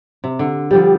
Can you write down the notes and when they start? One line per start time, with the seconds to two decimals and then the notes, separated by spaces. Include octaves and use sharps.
0.24 C3
0.39 D3
0.71 D3 F3 G3 G4